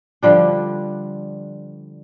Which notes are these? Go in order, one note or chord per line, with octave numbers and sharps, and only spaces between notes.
D3 F3 G3 D4